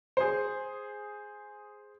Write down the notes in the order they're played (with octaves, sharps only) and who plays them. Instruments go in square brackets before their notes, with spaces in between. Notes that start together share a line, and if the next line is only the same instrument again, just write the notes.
[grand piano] G#4 C5